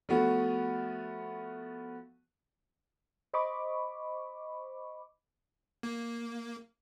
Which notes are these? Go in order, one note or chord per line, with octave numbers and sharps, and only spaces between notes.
F3 A3 B3 F#4
C5 D#5 B5 C#6 D6
A#3